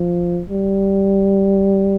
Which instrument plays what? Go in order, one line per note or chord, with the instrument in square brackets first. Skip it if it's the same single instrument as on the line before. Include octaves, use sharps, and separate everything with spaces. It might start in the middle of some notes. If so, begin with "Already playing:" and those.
Already playing: [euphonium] F3
G3